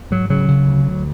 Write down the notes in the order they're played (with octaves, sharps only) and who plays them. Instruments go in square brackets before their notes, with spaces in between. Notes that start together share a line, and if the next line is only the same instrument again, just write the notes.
[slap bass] G#2 F#3
C#3 F#3
C#3
D2
D2